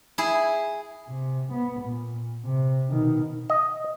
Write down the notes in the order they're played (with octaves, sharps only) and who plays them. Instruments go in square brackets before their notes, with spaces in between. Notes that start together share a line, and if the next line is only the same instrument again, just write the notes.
[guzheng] E4 G#4
[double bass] C3
B3
A#2
C3
B2 D#3
[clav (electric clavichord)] D#5